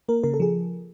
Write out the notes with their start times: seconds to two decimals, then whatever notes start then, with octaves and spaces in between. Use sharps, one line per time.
0.09 A#3 A#4
0.23 C#3 A#4
0.34 A4
0.40 F3 G#4